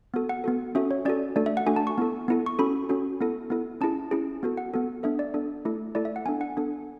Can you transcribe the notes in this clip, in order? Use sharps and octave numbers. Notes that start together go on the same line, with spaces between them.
B3 F#4 A4
F#5
B3 F#4 A4
C#4 F#4 A4 E5
C#5
C#4 F#4 A4 D5
A3 D4 F#4 A4 D5
E5
F#5
A3 D4 F#4 A4 G#5
A5
C#6
B3 E4 A4
B3 E4 A4
C#6
C#4 F#4 A4 B5
C#4 F#4 A4
B3 E4 A4
B3 E4 A4
C#4 E4 G#4 A5
C#4 E4 G#4
B3 F#4 A4
F#5
B3 F#4 A4
B3 D4 A4 E5
D5
B3 D4 A4
A3 E4 A4
A3 E4 A4 D5
E5
F#5
B3 D4 A4 G#5
F#5
B3 D4 A4